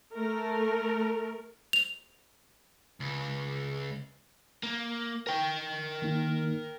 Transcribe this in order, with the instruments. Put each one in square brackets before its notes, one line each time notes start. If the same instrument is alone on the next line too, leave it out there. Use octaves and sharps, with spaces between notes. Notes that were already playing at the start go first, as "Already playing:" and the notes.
[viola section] A3 A#4
[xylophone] F7
[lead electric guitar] C#2
[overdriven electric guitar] A#3
A#4 G5
[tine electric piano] D#3 A#3 D#4